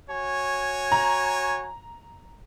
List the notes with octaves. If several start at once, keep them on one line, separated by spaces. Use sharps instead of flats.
F#4 C#5 G#5
A#5